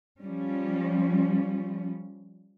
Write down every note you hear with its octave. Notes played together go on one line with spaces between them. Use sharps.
F3 G3 C#4